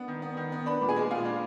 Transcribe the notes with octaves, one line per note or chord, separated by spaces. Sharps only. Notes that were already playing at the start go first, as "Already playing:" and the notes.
Already playing: B3 D4 B4
D#3
B3
D#3
B3
D4 B4 B5
A#2
G#4 G#5
G#3
A#2 F4 F5
D4